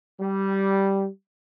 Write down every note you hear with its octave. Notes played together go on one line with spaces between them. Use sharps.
G3